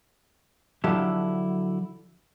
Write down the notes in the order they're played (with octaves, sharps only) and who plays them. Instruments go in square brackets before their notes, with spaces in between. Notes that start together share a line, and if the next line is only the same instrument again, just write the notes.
[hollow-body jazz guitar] D3 F3 F#3 E4 G4 A4